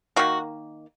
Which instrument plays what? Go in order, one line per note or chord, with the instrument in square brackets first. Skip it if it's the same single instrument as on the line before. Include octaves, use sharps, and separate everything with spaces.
[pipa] D#3 A#3 F#4